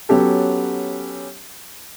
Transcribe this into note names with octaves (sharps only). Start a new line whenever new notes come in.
F#3 B3 C#4 G4 A4